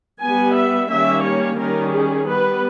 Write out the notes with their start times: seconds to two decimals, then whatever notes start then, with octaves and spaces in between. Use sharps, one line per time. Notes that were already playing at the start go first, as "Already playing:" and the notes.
0.21 G3 B3 G#5
0.56 E5
0.90 D#3 G3 A#3 C#4 E5
1.25 C#5
1.58 D#3 G3 C#4 A#4
1.94 G#4
2.28 G3 B3 B4